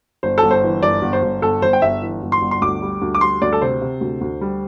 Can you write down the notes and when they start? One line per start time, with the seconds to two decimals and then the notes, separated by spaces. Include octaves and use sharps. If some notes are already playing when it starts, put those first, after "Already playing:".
0.23 G1 C5
0.38 A4
0.43 G1
0.51 C5
0.64 E3
0.83 G1 D5
1.02 G1
1.13 C5
1.22 G1
1.42 G1 A4
1.62 G1 C5
1.73 G5
1.82 G1 E5
2.02 E3
2.23 G1
2.32 C6
2.42 G1
2.51 C6
2.61 D2 D6
2.82 G3
3.01 D2
3.15 D6
3.21 G3 C6
3.41 D2 D5
3.53 A4
3.62 C3 C5
3.82 C3
4.01 D2
4.21 D2
4.41 G3